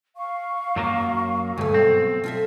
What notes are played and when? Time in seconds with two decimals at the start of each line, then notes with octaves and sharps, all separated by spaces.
0.16 F5 C#6
0.76 F#2 F#3 A#3
1.58 D2 G2 A3 G#4
1.74 B1 C4
2.24 F4 A4 E5